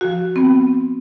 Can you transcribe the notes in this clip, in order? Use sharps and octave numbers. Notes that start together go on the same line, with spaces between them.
F3 F#4
B3 C4